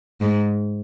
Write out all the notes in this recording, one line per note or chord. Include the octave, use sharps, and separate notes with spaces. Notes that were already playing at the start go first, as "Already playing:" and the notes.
G#2